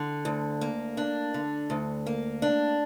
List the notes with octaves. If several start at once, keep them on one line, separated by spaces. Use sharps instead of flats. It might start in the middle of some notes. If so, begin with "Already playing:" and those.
Already playing: D3
D2
A#3
D4
D3
D2
A#3
D4